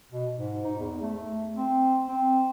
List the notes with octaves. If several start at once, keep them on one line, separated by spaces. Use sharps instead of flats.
B2
G#2
D#4
E2
A3
C4
C4